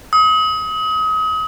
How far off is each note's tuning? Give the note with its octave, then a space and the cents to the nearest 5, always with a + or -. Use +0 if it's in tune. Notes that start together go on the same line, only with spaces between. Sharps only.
D#6 +35